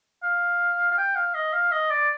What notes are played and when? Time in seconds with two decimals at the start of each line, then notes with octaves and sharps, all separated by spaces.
0.23 F5
0.91 F5
0.98 G5
1.16 F5
1.35 D#5
1.53 F5
1.72 D#5
1.90 D5